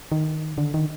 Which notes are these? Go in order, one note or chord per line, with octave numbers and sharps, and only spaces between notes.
D#3
D3
D#3